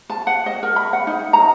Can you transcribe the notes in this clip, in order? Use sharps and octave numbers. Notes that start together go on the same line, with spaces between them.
A5
F#5
D#5
A#4
B5
F#5
D#4
A#5